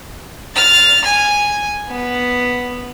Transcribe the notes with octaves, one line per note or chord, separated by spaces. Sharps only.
F6 A6
G#5
B3